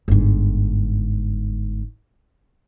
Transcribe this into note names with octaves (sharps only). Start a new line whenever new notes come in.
G1 G#2